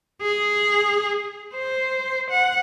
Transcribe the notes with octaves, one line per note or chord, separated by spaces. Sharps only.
G#4
C5
F#5